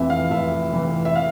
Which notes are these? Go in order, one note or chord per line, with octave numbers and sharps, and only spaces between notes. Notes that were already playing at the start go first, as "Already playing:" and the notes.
Already playing: F1 F2 C3 E3 E5
F5
F1 E5
F2 C3 E3
E5
F5